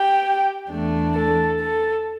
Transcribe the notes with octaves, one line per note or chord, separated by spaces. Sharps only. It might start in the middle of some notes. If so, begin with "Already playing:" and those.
Already playing: G4 G5
E2 E3 A3 D4
A4
A4